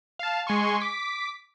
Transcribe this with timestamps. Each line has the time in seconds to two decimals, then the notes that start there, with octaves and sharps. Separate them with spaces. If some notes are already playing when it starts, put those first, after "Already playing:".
0.19 F5 A5
0.47 G#3 G#5 C6 C#6
0.80 D6 B6